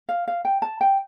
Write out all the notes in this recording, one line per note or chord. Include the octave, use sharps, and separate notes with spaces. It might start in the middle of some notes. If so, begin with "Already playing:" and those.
F5
F5
G5
A5
G5